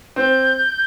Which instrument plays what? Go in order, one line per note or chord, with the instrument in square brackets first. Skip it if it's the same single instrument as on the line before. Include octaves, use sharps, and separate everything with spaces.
[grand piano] C4 [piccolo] G6